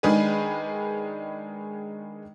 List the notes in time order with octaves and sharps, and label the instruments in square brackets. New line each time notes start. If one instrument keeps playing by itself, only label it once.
[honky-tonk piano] D#3 G#3 D4 G#4 B4